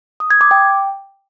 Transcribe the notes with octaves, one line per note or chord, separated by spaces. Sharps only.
D#6
G#6
D6
G5